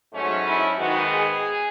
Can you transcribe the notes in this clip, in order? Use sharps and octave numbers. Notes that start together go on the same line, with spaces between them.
G#2 F#3 A3 C#4
E4
G#2 D#3 G#3 B3 F#4
G#4